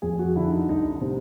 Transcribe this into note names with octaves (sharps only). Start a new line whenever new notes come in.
F2 G#4
F#4
D3 E4
D#4
C2 D#4
C3